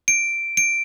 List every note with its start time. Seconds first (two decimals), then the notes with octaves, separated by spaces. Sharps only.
0.08 D7
0.57 D7